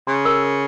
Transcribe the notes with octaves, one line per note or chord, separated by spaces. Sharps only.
C#3 C6
A#4
A#4